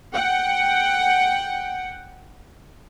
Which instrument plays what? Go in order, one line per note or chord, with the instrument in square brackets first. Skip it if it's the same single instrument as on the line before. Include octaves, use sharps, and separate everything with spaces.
[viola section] F#5 G5